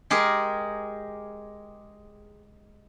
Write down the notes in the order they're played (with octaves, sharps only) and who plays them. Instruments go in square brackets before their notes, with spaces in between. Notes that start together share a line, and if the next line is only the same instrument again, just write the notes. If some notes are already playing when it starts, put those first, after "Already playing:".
[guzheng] G#3 G4 G#4 A#4